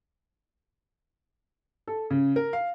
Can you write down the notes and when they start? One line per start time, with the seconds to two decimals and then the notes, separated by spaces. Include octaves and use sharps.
1.88 A4
2.10 C#3
2.36 A#4
2.53 F5